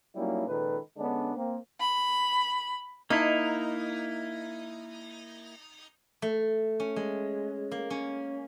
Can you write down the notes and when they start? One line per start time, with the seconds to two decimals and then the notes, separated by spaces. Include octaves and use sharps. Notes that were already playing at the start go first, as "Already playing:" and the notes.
0.16 F#3 G3 A#3 C#4 D#4 E4
0.47 C#2 A#2 D#3 A4 B4
0.97 D3 G#3 B3 C#4 D4
1.35 A#3 C4
1.79 B5
3.10 A#3 D#4 E4
6.22 A3
6.80 C#4
6.96 G#3
7.71 A#3
7.90 C#4